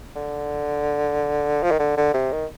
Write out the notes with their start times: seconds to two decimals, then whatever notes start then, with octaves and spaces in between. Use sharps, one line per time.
0.16 D3
1.63 F3
1.71 D#3
1.79 D3
1.97 D3
2.14 C3
2.32 D#3